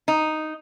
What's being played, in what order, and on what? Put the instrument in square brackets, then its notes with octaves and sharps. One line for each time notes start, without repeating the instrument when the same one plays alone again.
[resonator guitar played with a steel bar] D#4